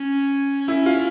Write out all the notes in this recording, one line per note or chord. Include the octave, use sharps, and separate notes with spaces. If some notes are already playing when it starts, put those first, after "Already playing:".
Already playing: C#4
C#4 E4
F4